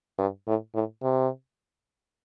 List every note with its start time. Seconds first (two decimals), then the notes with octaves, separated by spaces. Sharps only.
0.19 G2
0.47 A2
0.74 A2
1.03 C3